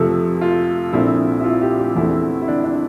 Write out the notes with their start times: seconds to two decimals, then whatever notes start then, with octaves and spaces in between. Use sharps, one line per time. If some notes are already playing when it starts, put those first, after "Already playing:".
Already playing: F2 C3 F3 A3 G4
0.41 F4
0.93 A#1 A#2 A3 C4 E4
1.40 E4
1.44 F4
1.61 G4
1.78 G4
1.96 E2 E3 A3 C4 E4
2.42 E4
2.48 D4
2.64 D4